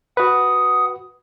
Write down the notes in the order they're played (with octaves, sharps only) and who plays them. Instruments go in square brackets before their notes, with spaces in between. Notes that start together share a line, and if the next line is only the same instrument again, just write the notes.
[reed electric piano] F#4 B4 [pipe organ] F#5 D#6